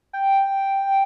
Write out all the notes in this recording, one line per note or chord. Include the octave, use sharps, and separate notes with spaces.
G5